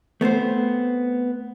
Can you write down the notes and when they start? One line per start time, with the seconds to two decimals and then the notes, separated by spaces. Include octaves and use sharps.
0.21 A3 B3 C4 C5